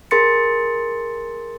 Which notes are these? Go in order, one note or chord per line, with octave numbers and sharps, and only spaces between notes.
G#4 A#4 C6 A6 C#7